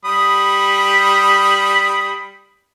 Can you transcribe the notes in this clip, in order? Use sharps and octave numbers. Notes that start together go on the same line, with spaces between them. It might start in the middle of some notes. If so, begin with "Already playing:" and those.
G3 B5 D#6